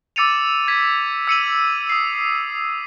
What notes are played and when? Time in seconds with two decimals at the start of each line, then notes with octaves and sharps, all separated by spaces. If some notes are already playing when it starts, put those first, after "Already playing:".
0.16 D6 E6 A6 C#7 D#7 F7
0.68 G#6 B6
1.27 E6 C#7 D#7 F#7
1.89 D#6 C7